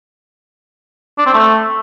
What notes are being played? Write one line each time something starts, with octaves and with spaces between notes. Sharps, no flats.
D4
C4
A3